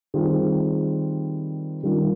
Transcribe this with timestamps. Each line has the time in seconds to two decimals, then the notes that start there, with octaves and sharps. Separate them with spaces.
0.14 D#3 G3 C4 F4 G#4
1.83 D#3 G3 A#3 C#4 F4